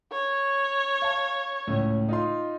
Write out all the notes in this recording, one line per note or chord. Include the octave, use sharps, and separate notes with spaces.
C#5
F5 A5
C#2 A2 C#4
D#4 F4 C6